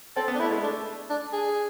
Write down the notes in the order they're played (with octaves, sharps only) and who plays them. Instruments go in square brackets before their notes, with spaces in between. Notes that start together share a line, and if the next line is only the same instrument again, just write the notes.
[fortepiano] C4 [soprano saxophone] A4
[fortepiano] B3
[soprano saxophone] D4
[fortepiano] A3 [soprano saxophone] E4
[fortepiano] G#3
[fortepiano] A3 [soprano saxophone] D4
[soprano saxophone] D4
G#4